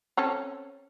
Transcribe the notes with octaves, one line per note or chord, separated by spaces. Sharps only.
C4 C#4 A4